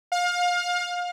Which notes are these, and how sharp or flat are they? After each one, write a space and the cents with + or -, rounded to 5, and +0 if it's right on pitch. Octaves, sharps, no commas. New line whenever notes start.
F5 +30